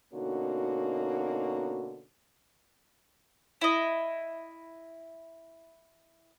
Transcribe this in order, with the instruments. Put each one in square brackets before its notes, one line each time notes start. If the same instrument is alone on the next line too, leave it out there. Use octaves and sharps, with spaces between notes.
[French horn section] B2 D3 A#3 C#4 D#4 F#4
[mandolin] E4 D#5